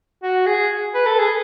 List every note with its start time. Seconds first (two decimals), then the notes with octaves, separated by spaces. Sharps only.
0.22 F#4
0.46 G#4
0.94 B4
1.06 A4
1.19 G#4